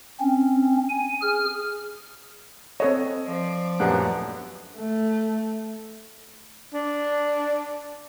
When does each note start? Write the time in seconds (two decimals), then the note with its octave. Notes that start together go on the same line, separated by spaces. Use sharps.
0.20 C4 C#4
0.89 G#5
1.21 G#4 F6
2.80 C4 A4 C#5 D#5
3.26 F3 D5
3.80 D#1 F#2 A3 B3 D4
4.77 A3
6.74 D4